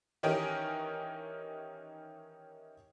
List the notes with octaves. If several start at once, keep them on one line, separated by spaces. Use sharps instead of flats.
D#3 E3 C#4 D#4 G4 A#4